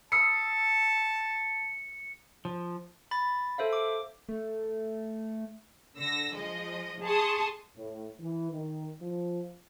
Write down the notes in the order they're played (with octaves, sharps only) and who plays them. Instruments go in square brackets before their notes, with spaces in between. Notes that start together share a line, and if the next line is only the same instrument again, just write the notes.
[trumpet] A5 [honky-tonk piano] D#6 E6 C7 [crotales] C#7
[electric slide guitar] F3
[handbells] B5 A6
A4 C5 E5 F5
D6
[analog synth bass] A3
[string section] D3 E6 A#6
F3 G#3 D#5
G#4 A5 C6 C#6 D#6
[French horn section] A2
E3
D#3
F3